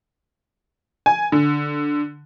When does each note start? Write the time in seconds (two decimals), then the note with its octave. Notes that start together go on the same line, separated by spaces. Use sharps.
1.06 G#5
1.32 D3